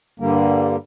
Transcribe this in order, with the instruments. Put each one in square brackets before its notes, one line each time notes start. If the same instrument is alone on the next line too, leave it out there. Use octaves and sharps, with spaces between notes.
[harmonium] G2 D3 G3 A#3